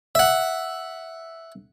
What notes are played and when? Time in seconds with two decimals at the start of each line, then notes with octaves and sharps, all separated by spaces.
0.15 E5 F#5